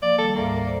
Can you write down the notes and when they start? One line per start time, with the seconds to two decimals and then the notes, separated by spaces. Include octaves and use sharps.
0.02 F3 A#3 D5
0.18 D#3 G3 A4
0.35 D2 G#2 A#3 E5
0.66 A4 C5 D5